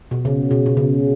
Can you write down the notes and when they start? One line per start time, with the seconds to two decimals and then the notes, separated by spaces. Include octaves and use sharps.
0.11 B2
0.25 C#3
0.51 B2
0.66 B2
0.77 C#3